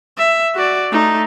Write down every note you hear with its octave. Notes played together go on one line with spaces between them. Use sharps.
E5
F#4 D5
A3 D#4